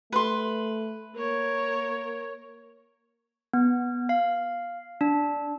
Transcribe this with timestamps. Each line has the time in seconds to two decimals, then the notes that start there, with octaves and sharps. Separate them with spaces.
0.12 A3 B4 C6
1.16 A#3 A#4 C#5
3.53 B3
4.09 F5
5.01 D4